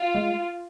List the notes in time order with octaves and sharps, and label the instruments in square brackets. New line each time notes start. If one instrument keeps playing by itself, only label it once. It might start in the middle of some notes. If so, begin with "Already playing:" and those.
Already playing: [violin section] F4
[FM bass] G#3